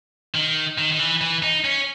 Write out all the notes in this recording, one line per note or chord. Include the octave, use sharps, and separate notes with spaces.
D#3
D#3
D#3
E3
E3
D#4
C#4